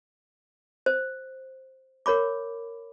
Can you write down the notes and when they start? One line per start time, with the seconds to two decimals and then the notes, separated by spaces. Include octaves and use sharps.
0.86 C5
2.06 A#4 C#5 B5 D6